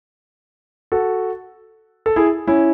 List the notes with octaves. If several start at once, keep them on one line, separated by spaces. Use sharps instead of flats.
F#4 A4
A4
E4 G#4
C#4 E4